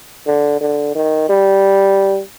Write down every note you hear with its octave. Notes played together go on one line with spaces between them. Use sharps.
D3
D3
D#3
G3